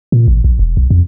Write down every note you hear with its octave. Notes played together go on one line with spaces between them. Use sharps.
A#2
A1
A#1
E1
B1
F2